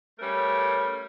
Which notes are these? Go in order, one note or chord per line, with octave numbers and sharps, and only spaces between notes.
G3 A3 C#4 A#4 B4